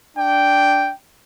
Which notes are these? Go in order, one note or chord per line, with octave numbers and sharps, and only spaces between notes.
D4 G5